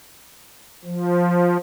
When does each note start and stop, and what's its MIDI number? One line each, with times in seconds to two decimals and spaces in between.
0.85 1.57 53